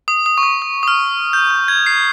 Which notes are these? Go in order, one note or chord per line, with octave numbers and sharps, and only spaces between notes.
D#6
D#6
C#6
D#6
D#6
D#6
F6
G6
G6
G#6
C7